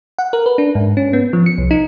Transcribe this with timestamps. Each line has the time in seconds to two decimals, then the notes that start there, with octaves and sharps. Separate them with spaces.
0.18 F#5
0.33 A#4
0.46 B4
0.58 D4
0.75 G#2
0.97 C#4
1.13 B3
1.33 F3
1.46 C#7
1.58 C2
1.71 D#4